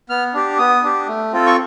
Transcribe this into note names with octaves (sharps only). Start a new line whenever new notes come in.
B3 F6
D4 G4
B3 D#6
D4 G4
A3
C4 F4 A4
C#6